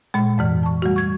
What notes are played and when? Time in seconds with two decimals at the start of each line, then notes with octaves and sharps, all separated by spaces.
0.14 A#2 G#3
0.38 F2 G#2 E3
0.63 A5 C#6
0.82 G3 A3 F#4
0.96 C#6 G#6